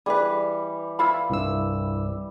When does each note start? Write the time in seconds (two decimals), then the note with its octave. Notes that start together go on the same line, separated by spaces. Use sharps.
0.06 E3 G3 G#4 B4
0.99 E4 F4 B5
1.30 C2 G2 E6